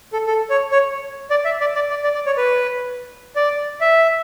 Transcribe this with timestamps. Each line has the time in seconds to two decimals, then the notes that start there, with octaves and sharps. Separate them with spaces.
0.13 A4
0.27 A4
0.50 C#5
0.72 C#5
1.30 D5
1.45 E5
1.60 D5
1.75 D5
1.90 D5
2.04 D5
2.15 D5
2.26 C#5
2.37 B4
3.36 D5
3.81 E5